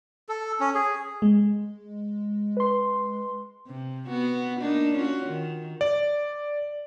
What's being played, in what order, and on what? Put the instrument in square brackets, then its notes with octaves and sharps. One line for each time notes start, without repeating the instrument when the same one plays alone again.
[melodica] A4
C#4
G#4
[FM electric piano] G#3
[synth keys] B4 C6
[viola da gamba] C3
B3 F#4
A#3 D4 D#4
C#4 F4 F#4
D#3
[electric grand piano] D5